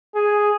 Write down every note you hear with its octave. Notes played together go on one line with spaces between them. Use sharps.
G#4